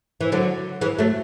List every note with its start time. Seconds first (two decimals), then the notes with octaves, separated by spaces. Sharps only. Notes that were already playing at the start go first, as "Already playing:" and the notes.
0.21 E3
0.32 D3 F#3
0.81 E3 G#3
0.99 F#3 A3